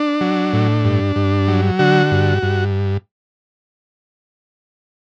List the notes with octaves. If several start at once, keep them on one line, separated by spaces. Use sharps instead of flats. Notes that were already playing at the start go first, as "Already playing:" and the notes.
Already playing: D4
F#3
A2
G2
G2
F#3
D3 F#4
G2
G2